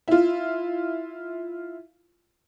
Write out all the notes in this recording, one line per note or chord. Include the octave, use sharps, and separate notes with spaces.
E4 F4